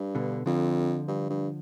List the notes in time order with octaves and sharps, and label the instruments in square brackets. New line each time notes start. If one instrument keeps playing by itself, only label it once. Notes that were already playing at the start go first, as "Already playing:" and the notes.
Already playing: [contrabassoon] G2
[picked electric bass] B2 D3
[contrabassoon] F2 [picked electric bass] D3 F3
[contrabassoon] G2
G2